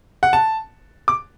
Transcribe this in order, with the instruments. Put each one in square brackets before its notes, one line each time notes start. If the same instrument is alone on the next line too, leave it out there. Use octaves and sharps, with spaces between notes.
[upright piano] F#5
A5
D6